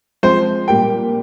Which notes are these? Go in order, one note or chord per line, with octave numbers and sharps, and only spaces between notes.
F3 G#3 C4 C5
A#2 G3 A#3 G5